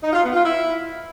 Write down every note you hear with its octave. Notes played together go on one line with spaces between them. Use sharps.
D#4
F4
B3
F4
E4